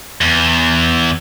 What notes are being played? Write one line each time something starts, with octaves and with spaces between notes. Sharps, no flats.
E2